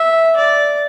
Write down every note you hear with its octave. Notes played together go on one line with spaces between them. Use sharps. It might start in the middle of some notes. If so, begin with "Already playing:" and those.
Already playing: E5
D5